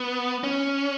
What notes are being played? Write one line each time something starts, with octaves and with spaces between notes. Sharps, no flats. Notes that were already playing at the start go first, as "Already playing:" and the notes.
Already playing: B3
C#4